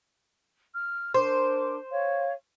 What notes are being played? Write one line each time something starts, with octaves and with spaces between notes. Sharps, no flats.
F6
D4 A#4 C5 D6
C#5 F5